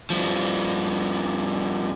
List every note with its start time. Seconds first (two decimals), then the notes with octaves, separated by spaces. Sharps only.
0.10 G2 F3